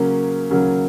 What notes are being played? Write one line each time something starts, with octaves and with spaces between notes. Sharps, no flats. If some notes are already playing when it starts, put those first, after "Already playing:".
Already playing: C#3 F#3 A#3 C#4
C#3 F#3 A#3 C#4